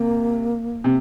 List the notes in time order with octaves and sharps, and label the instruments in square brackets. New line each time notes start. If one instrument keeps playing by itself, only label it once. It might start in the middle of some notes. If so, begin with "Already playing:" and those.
Already playing: [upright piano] C3 [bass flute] A#3
[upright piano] C3